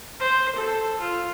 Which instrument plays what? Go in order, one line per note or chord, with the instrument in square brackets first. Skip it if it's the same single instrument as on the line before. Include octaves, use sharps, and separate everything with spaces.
[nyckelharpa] C5
A4
F4